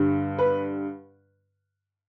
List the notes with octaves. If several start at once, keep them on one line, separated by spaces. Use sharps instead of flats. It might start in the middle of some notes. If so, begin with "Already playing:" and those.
Already playing: G2 D3 G3
B4